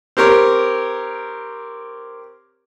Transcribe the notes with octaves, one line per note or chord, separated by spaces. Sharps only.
C4 G4 A#4 C#5